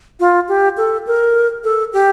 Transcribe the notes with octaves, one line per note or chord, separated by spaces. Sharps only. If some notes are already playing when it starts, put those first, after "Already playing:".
F4
G4
A4
A#4
A4
G4